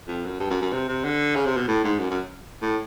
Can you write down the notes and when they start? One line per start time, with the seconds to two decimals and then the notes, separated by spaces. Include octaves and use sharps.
0.08 F2
0.25 F#2
0.40 G2
0.50 F#2
0.61 F#2
0.73 C3
0.89 C3
1.05 D3
1.35 C#3
1.46 C3
1.57 B2
1.68 A2
1.84 G#2
1.99 F#2
2.11 F#2
2.62 A2